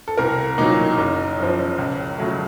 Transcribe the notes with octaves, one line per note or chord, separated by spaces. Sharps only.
A4
C2 A#4
A#2 F#3 D#4
F#1
F#2 F3
C#2
C#3 F#3 A3